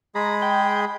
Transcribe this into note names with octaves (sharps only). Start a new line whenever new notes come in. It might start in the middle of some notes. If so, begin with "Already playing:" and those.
G#3 G#4 A#5 B5
G5